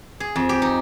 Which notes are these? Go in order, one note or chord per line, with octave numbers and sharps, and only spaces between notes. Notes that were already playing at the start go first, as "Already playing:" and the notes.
G#4
F2
G4
D#4